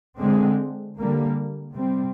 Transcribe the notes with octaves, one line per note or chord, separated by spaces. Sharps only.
D3 G#3 C4
D3 G3 A#3
C3 G3 C4